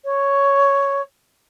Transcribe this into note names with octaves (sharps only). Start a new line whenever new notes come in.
C#5